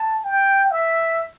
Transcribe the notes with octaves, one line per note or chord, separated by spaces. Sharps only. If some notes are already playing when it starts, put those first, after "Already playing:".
Already playing: A5
G5
E5